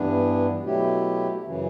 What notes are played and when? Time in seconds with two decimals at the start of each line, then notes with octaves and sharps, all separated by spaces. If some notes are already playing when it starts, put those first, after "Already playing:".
Already playing: G2 E3 B3 D4
0.62 B2 F#3 A3 E4 G4
1.44 F#2 C#3 E3